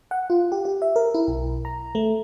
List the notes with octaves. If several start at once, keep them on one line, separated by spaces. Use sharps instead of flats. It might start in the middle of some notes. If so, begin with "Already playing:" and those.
F#5
F4
G4
G4
E5
A#4
E4
B1
A#5
A3